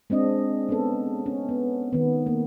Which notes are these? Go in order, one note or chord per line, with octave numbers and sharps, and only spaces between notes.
G#3 C4 D4 D#5
B3 C#4 A4
C#4
B3
D#3 B3
A#3